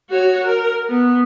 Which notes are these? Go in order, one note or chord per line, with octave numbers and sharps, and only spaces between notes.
F#4 C#5
A#4
B3